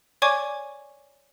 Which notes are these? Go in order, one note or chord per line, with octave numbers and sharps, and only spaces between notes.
C#5 D5 G#5 C#6 D6 G#6